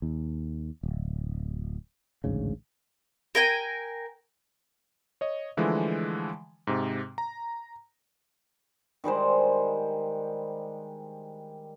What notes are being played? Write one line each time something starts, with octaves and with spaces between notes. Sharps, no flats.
D#2
D1
A1 D2 G#2 C#3
A#4 G5 G#5
C#5 D#5
D3 E3 F3 G#3 A3
G#2 C3
A#5
D#3 G3 G#3 C5